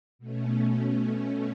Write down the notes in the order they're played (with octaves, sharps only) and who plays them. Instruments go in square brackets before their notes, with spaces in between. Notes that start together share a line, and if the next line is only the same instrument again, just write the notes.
[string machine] B2 A3 C#4